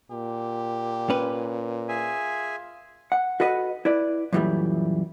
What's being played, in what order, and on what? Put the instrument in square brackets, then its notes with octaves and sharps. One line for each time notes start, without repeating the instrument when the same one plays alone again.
[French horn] A#2 [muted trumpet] G4
[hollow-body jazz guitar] C#4 B4
[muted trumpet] F4 [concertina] G#4 E5 G#5
[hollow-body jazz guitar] F#5
F#4 A4 B4 D#5 F#5
E4 B4 D5
F#2 A#2 E3 F3 G3 A3